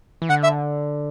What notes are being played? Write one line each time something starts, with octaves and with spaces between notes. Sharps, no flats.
E3
D3 F#5
E5